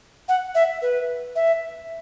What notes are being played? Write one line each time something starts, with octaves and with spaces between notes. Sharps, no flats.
F#5
E5
B4
E5